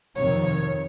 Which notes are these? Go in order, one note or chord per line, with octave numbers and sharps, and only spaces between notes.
F2 C3 D#3 C#5